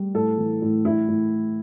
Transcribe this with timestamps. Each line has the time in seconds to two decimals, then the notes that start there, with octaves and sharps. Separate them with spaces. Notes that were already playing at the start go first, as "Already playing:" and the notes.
Already playing: G3
0.14 A2 A4
0.38 E3
0.62 A2
0.85 A2 E4
1.08 A2